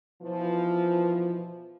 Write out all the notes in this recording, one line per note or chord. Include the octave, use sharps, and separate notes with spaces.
B2 E3 F3